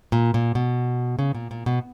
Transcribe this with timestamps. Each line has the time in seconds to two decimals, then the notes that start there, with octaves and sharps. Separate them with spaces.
0.12 A#2
0.34 A#2
0.55 B2
1.19 C#3
1.35 A#2
1.51 A#2
1.66 B2